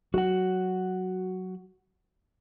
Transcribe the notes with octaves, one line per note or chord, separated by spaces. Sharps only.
F#3 F#4 F#5